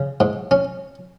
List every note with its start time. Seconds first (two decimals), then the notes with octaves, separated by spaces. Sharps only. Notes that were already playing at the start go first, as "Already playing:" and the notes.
Already playing: C#3
0.20 G#2
0.51 C#4